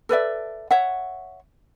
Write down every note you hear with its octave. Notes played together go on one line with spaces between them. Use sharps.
A4 B4 D5 E5
C#5 E5 F#5